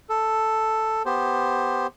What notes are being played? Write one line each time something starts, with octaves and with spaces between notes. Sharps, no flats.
A4
B3 G4 C5